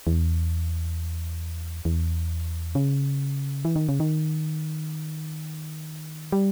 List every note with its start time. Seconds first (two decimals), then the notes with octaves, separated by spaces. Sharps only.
0.07 E2
1.85 E2
2.75 C#3
3.65 E3
3.76 D#3
3.89 C#3
4.00 D#3
6.32 G3